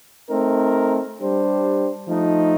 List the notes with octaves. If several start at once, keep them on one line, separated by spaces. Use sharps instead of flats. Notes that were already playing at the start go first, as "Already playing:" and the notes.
A3 C4 D#4 A#4
G3 D4 G4 C5
F3 A3 D#4